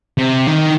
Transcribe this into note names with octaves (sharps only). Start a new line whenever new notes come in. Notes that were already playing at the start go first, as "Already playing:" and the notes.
C3
D#3